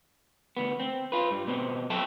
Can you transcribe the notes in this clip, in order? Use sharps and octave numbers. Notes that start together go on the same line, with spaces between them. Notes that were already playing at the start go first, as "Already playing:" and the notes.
D2 B3
C4
F4 B4
G2 G3
B2 B3 C4
F#3 C4 A4 E5 G5 A5